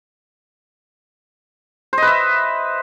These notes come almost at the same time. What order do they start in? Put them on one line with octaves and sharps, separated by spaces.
C5 D#5 B4 E5